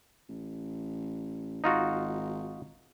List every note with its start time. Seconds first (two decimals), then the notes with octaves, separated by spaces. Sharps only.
0.29 A1
1.64 G#1 D#4 F4 F#4